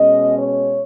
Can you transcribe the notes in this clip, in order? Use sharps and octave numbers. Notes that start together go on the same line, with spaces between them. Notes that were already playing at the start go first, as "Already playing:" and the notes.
Already playing: B2 G#3 C#4 D#5
C#5